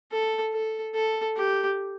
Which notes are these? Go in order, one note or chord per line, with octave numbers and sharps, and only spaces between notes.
A4
A4
A4
G4